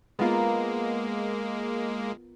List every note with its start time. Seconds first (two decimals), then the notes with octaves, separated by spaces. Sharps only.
0.19 G#3 A#3 B3 F4 A#4